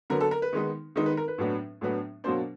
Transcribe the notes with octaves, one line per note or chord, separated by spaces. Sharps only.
D3 F#3 B3 A#4
A4
A#4
B4
D#3 G#3 B3 D#4
D#3 G#3 B3 D#4
B4
A#4
B4
A2 F#3 B3 D4
A2 F#3 B3 D4
B2 F#3 A#3 D4 C5